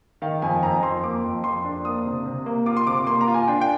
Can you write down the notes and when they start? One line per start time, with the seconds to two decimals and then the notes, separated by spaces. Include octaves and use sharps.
0.22 D#3 F5
0.42 F2 G#5
0.62 F2 A#5
0.83 F2 C6
1.03 A#3 D6
1.24 F2
1.44 F2 C6
1.65 D4
1.85 A#3 D#6
2.05 C3
2.25 C3
2.46 A#3
2.66 F4 D6
2.77 C6
2.87 C3 D6
2.97 D6
3.07 A#3 C6
3.21 A#5
3.28 F4
3.34 G#5
3.48 D4 G5
3.61 G5